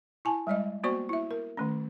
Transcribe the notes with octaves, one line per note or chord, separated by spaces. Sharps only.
E4 G#5 A5
G3 G#3 D5 D#5
A#3 B3 F#4 C5 D5 C#6
E4 E5
A#4
D#3 A3 C#4